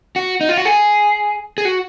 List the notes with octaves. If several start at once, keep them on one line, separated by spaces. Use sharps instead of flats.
F#4
D#4
F4
F#4
G#4
G#4
F#4